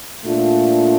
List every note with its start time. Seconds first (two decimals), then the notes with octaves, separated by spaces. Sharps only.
0.25 A#2 A3 D4 F4